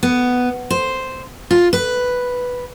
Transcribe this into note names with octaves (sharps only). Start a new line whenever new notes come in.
B3
C5
F4
B4